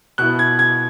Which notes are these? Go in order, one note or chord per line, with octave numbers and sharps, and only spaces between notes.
B2 B3 E4 F#6
G#6
G#6